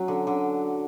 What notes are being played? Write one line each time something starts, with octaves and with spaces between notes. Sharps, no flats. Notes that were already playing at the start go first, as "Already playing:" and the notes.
Already playing: F#3 C#4
D3
D3